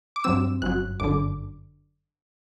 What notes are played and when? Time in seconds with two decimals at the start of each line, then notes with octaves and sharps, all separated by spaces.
0.16 D6
0.24 G2 F#3 C4 E6
0.62 G1 F#2 F#3 F#6
1.00 G1 F#2 D3 D6